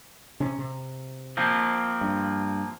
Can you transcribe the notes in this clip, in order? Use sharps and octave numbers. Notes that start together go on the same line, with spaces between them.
C3 C#4
C3
F3 A#3 C4
G2